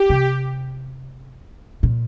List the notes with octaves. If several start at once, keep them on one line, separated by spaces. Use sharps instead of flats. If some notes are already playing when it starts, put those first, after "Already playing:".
Already playing: G4
C3
A#2